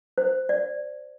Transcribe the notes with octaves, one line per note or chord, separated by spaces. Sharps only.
C5
D5